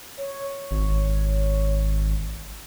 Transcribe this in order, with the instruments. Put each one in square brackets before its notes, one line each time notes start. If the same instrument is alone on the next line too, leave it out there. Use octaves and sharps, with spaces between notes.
[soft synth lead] C#5
[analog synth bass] G#1